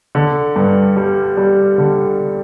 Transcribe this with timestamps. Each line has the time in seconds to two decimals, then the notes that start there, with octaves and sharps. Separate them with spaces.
0.15 D3
0.56 G2
0.97 G3
1.37 G3
1.78 D3